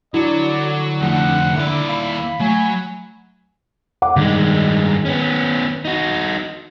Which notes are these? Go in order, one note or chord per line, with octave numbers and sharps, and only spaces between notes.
D3 F#3 E4 D5
F2 A3 F#5
D#2 E4 D5 E5
F5 B5
F#3 A3 G#5
F#5 D6
G2 D#3 G#3
B3 C#4
D#4 F#4